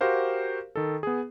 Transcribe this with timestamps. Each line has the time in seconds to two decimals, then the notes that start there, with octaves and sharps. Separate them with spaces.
0.01 F#4 G4 A#4 C5 F5
0.76 D#3 A4
1.03 B3 G#4